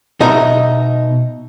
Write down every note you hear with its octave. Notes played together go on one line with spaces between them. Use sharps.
B2 D#4 D#5 E5 A#5